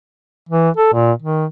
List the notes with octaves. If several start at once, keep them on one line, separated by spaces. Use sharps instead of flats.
E3
A4
A#2
D#3